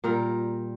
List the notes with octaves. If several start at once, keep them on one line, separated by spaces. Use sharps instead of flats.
A#2 G3 A#4